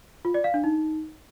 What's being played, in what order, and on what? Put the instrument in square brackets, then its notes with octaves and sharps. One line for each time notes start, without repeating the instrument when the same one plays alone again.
[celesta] F4
D5
F5
D4
D#4